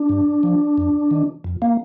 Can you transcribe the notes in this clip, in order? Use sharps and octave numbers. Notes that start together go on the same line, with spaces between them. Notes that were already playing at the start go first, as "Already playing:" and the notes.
Already playing: D4
G2
F3
F2
D#3
F2
A#3